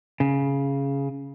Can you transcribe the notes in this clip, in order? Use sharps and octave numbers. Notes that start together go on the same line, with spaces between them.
C#3